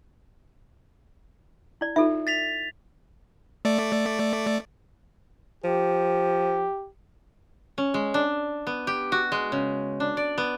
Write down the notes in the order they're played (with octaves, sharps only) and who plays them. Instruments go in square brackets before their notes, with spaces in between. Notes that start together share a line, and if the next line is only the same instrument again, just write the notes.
[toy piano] E4 D5
[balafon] D#4 F4 [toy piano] A4 E5
[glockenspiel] A6 B6 F7
[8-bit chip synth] A3 D5
[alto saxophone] F3 [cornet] G4
[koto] C#4
G#3
D4
B3
G4
F#4
G#3
C#3
D4
D5
B3